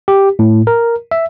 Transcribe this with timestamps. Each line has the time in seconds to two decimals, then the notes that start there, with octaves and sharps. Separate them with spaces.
0.08 G4
0.39 A2
0.67 A#4
1.11 E5